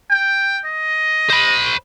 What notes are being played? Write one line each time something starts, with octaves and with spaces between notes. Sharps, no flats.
G5
D#5
C5 B5